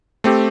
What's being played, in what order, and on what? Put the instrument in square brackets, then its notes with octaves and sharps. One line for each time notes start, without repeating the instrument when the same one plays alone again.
[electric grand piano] A3 C4 G4